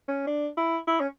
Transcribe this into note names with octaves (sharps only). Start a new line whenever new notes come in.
C#4
D4
E4
E4
C#4